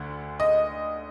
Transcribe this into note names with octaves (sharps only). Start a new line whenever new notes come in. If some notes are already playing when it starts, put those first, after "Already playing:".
Already playing: D2 D3
D#5